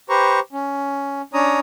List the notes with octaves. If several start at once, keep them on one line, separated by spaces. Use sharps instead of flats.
G4 B4 C5 A#5 C#6
C#4
C#4 D4 C#5 A#5 D#6